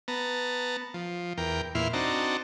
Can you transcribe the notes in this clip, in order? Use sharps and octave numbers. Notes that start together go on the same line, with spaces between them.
B3 A5 A#5
F3
E2 A#4 G5
E2 A#2 E4 C6 F6
C4 D4 D#4 F#4 A5 A#5